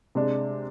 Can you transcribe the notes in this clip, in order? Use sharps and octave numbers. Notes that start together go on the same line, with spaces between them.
C3 G#3 D4